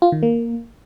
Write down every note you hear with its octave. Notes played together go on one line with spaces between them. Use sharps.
F4
D#3
A#3